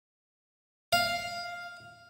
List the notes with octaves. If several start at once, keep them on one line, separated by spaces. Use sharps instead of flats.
F5